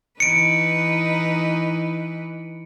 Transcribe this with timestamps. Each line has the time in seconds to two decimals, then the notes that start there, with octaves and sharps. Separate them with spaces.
0.20 E3 D#4 B4 C#7 D7